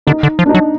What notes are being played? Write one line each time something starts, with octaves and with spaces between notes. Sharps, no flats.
D3 D#4
D3
F3
D4
D#4
F#3